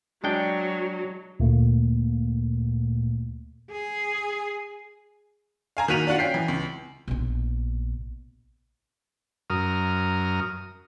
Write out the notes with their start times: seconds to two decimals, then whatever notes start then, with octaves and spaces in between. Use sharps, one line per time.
0.24 F#3 G#3 D4 G5
1.40 D2 A#2 A3 A#3
3.71 G#4
5.77 F5 G#5 A#5
5.88 D#3 A#3 F#4 B6 D#7 F7
6.07 D4 F4 F#4 F#5
6.19 C#4 G5 B6 C7
6.34 E3
6.48 C#2
7.08 A#1 B2
9.50 F#2 A#4 D#6 F6